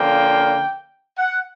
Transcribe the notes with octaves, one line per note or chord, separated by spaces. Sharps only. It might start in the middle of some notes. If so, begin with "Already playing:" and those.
Already playing: D3 F3 A#3 C#4 G5
F#5